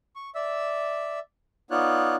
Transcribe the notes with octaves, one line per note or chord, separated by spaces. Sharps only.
C#6
D5 E5 E6
B3 D#4 F4 C#5 D5 F#6